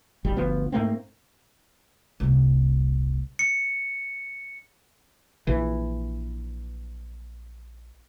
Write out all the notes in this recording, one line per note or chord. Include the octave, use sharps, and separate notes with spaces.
D1 G#1 G3
G1 D2 F3 B3
G#2 A3 A#3 C4
D#1 C2
C#7
A#1 E3